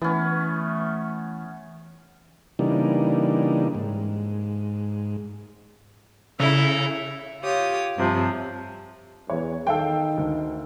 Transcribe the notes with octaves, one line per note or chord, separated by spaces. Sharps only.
E3 A3 B3 C#4
C#3 E3 G3 A#3 D4 D#4
G#2
C#3 E4 A4 A#5
F4 G4 C#5 D#6
G2 C3 F3
E2 C#5
D#3 A4 F5 G5
D2